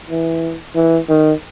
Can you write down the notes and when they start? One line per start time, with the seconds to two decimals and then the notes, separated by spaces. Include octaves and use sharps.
0.10 E3
0.76 E3
1.09 D#3